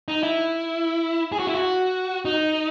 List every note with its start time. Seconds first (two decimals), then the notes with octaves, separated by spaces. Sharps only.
0.08 D#4
0.23 E4
1.32 G#4
1.40 F#4
1.47 E4
1.54 F#4
2.25 D#4